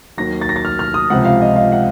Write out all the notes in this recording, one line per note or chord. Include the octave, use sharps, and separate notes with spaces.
D#2 D#3 F#3 A#6
A6
A#6
A6
F6
F6
D#6
C#2 C3 F3 F#5
F5
D#5
F5
F#5